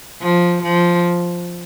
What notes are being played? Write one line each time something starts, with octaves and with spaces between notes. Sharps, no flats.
F3
F3